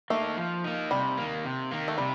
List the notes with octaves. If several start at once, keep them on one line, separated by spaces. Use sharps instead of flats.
A3 A#3 D#4
F3
A#3 D#4
C3 G3
D#3 A#3
C3
D#3 A#3
A3
C3 G3